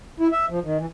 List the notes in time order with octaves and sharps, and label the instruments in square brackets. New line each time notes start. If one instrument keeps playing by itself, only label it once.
[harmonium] E4
E5
F3
D#3
E3